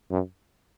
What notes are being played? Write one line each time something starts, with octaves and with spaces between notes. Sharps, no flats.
F#2